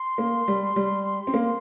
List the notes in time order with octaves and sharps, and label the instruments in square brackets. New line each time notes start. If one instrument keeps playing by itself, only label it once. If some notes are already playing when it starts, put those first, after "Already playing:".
Already playing: [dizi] C6
[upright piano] A#3
G3
G3
C4
A#3